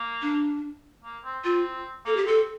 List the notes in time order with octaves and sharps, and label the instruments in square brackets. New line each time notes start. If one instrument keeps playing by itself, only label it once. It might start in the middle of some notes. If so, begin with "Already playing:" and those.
Already playing: [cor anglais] A#3
[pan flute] D4
[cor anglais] A#3
C4
[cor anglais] C4 [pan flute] F4
[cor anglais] A#3 [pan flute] A4
[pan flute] G4
[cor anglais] C4 [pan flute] A4